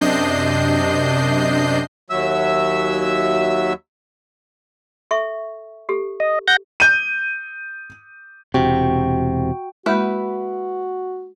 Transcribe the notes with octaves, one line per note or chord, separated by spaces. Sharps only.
F#2 C3 D4 D#5 G6 C7
D#2 F#3 E5 E6
A4 E5 C#6
G4 A4
D#5
F#5 G6 A#6
G6 D#7
E1 C3 F#4 G5
G#3 A#3 E4 F#4 B4